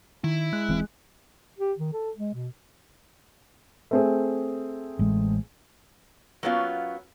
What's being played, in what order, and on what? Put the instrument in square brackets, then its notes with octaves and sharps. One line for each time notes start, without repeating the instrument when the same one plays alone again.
[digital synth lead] D#3 [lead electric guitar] E4
[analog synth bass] G#3 [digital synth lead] F#6
[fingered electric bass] D#1 E3 C4
[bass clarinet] G4
D#3
A4
G#3
B2
[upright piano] A3 C4 G#4
[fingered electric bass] A1 G#3
[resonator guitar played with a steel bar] F#3 A#3 B3 C#4 E4 F4